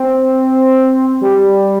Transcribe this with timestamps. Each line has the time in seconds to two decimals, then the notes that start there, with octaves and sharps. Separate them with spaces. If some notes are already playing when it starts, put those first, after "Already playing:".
Already playing: C4
1.21 G3